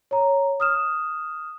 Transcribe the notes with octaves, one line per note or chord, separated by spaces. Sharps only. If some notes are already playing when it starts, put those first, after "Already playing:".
C#5 A#5
D#6 F6 E7